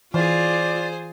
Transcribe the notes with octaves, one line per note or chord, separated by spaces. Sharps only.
E3 F4 G#4 C5 D5